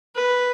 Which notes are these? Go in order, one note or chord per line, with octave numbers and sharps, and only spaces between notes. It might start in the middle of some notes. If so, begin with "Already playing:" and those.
B4